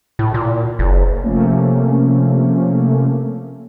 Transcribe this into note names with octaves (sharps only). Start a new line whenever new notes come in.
A2
A#2
F#1
C3 F3 A3 A#3 C#4